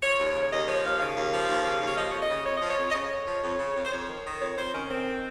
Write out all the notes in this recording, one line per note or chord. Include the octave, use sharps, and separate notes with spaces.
F3 C#5
D#2
C#5
C#3
C#5
D#2 D#5
F3 C#5
D#2 F5
C#3 F5
D#2
F3
D#2
C#3
D#2
C#5
F3 D#5
F2 C#5
D#5
C#3
F2 C#5
F3 D#5
C#5
F2
D#5
C#3 C#5
F2
F3
F2
C#3
F2
C5
F2 C#5
D#3
D#3
F2 C#5
F2 C5
D#3 C#4
D#3 C4